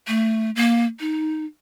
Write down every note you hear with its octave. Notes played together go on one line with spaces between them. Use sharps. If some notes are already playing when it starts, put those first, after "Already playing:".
A3
A#3
D#4